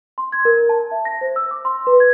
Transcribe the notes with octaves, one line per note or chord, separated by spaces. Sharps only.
C6
G#6
A#4
A5
E5
A#6
C5
E6
D6
C6
B4
G#6